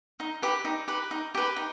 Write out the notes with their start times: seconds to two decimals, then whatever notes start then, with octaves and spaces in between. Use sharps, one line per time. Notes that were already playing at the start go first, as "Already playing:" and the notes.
0.20 D#4
0.42 G4 B4
0.65 D#4
0.88 G4 B4
1.11 D#4
1.35 G4 B4
1.56 D#4